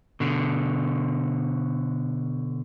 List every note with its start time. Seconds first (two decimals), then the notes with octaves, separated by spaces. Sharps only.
0.20 B2 D3